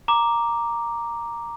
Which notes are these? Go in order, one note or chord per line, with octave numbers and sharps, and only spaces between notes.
A#5 D6